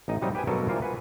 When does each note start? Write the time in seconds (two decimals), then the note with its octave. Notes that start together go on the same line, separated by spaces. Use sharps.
0.08 A1 D#4 D#5
0.22 C3 F#3 G3 D#4
0.35 G4 B4 G5 G#5
0.47 G2 B2 F#3 A4 A#4 C#5
0.68 E3 G3 A#3 F4 A#4 C5
0.82 B4 F#5 G#5